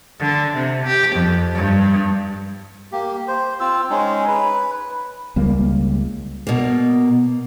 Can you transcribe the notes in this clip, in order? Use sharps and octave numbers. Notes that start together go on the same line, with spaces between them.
D3
C3
G4
F2
G2
A#3 G4
C5
C4 F4 E6
G#3 C#4 D#4
B4
C#2 G3 A#3
B2 A#3